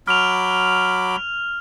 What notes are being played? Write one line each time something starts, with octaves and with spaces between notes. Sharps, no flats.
F#3 B5 D6 F6 F7